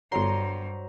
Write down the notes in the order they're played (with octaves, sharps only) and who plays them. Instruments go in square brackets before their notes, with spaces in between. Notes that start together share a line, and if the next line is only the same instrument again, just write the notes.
[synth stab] G1 C6 [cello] G2 [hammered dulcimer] F#3 C5 A#5